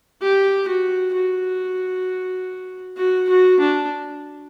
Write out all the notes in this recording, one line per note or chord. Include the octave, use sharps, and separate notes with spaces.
G4
F#4
F#4
F#4
F#4
D4